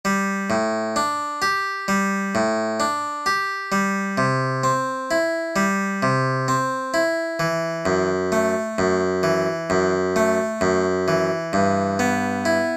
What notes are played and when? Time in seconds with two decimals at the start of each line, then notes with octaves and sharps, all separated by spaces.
0.05 G3
0.50 A2
0.96 D4
1.42 G4
1.88 G3
2.35 A2
2.80 D4
3.26 G4
3.72 G3
4.18 C3
4.64 C4
5.11 E4
5.56 G3
6.03 C3
6.48 C4
6.94 E4
7.40 E3
7.86 F#2
8.32 A3
8.78 F#2
9.23 E3
9.70 F#2
10.16 A3
10.61 F#2
11.08 E3
11.53 G2
11.99 B3
12.45 E4